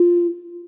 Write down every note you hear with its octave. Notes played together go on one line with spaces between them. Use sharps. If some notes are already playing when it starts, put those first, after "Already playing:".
Already playing: F4